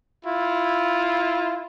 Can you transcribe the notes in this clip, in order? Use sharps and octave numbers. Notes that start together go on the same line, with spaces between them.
E4 F4